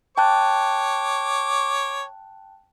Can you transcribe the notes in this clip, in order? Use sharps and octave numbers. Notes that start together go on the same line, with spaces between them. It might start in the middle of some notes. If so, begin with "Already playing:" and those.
C#5 G5 A5 D6 F#6